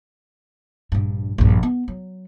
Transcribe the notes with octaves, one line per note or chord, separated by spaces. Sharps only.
A#1 G2
A#1 G2
B3
F#3